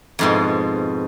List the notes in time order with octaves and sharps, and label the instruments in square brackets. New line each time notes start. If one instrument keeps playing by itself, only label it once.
[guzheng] F2 G#2 B2